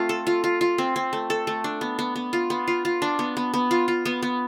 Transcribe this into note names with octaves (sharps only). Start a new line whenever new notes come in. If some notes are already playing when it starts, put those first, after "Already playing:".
Already playing: A3 C4 F4
A4
F4
F4
F4
C4
C4
A3
A4
A3
D4
B3
B3
B3
F4
B3
F4
F4
D4
B3
B3
B3
F4
F4
B3
B3